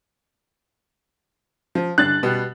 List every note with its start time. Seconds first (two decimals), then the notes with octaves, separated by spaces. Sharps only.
1.75 F3
1.98 G2 D3 F#6 A6
2.23 B2 G3 B3